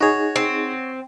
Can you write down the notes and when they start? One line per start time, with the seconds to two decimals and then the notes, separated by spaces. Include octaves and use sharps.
0.01 D#4 F#4 G#4 C#5
0.36 C4